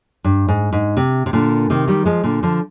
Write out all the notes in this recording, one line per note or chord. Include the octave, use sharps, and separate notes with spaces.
G2
G#2
G#2
C3
C3
A#2 D3
C3 D#3
D#3 G3
F3 G#3
A#2 D3
D3 F3